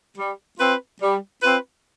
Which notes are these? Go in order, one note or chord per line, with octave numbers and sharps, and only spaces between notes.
G3
C4 F4 B4
G3
C4 F4 B4